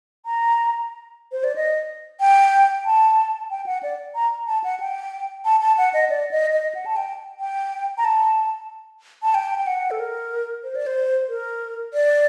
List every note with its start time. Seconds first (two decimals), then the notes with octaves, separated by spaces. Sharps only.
0.25 A#5
1.32 C5
1.44 D5
1.56 D#5
2.20 G5
2.85 A5
3.50 G5
3.66 F#5
3.83 D5
4.15 A#5
4.47 A5
4.64 F#5
4.80 G5
5.45 A5
5.61 A5
5.78 F#5
5.93 D#5
6.10 D5
6.31 D#5
6.53 D#5
6.75 F#5
6.86 A5
6.96 G5
7.40 G5
7.98 A#5
8.05 A5
9.22 A5
9.34 G5
9.58 G5
9.66 F#5
9.91 A4
9.99 A#4
10.63 C5
10.75 D5
10.86 C5
11.29 A#4
11.94 D5